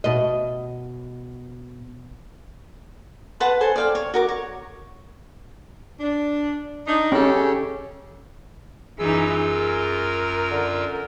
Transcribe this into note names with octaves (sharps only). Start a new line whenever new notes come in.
B2 D#5
B4 F#5 A5 C6
A4 C5 G#5
D5 F5 G5
C#5
F#4 A#4 D6
C#5
D4
D4 D#4
C#3 C#4 G4 A4
F#2 E3 D#4 F4 G#4 E6
A#4
D3